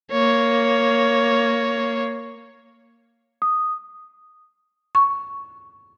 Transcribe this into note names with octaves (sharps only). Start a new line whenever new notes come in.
A#3 C#5
D#6
C#6